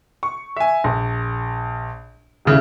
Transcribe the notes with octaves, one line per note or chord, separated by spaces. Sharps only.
C#6
E5 G#5
A#1
D#1 C#3 E4